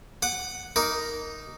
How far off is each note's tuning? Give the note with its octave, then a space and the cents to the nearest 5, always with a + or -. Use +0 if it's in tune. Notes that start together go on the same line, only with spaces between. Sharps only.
F#5 +0 D6 +45
D#4 +0 A#4 +0 D6 -20